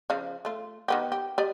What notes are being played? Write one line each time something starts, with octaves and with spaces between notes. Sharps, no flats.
C#3 F3 F5
A3 F4
D#3 B3 G4
G4
G4 D5 D#5